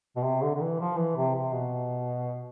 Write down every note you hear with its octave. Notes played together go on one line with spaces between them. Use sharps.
B2
C3
D3
D3
E3
F3
E3
C3
C3
B2